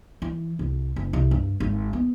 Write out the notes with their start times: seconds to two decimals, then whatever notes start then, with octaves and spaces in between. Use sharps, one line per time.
0.22 E3
0.59 C2
0.96 F#1
1.13 C2
1.31 G2
1.60 G#1
1.93 B3